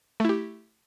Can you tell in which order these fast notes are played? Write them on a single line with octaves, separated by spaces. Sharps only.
A3 E4 G4